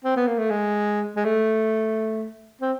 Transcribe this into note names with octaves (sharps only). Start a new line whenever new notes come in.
C4
B3
A#3
A3
G#3
G#3
A3
C4